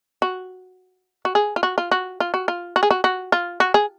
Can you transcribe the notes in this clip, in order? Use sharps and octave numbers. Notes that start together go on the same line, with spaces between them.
F#4
F#4
G#4
F4
F#4
F4
F#4
F4
F#4
F4
F#4
G#4
F#4
F#4
F4
F#4
G#4